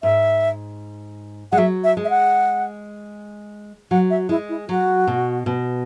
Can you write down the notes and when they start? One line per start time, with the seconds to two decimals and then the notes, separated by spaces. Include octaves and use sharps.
0.03 G#2 E5
1.52 G#3 F#5
1.58 F#3 E5
1.84 E5
1.97 G#3
2.05 E5
2.10 F#5
3.91 F#3 F#5
4.10 E5
4.29 G#3 E4
4.49 E4
4.68 F#3 F#4
5.07 B2
5.46 B2